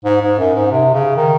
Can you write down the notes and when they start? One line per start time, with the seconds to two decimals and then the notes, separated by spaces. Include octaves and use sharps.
0.05 G#2
0.22 G#2
0.39 F#2
0.55 G#2
0.72 C3
0.94 C#3
1.16 D#3